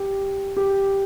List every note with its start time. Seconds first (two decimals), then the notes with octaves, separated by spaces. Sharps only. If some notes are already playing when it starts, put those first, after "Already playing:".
Already playing: G4
0.57 G4